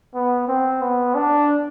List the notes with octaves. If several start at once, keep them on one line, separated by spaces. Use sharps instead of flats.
B3
C4
B3
D4